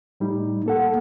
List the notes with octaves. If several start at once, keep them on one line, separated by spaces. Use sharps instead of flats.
A2 G3 D#4
A#3 A4 F#5